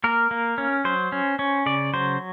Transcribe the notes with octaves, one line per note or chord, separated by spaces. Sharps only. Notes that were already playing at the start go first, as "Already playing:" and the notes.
A#3 A#4
A#3
C#4
F#3 C5
C#4
C#4
C#3 D5
F#3 C5